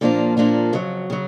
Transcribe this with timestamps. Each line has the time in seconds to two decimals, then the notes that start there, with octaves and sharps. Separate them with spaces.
0.01 A#2 F3 A#3 D4 F4
0.37 A#2 F3 A#3 D4 F4
0.73 F2 C#3 F#3
1.10 C#3 F#3